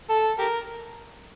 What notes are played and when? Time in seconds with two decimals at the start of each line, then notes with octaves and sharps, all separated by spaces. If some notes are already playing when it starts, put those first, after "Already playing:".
0.10 A4
0.39 G4 A#4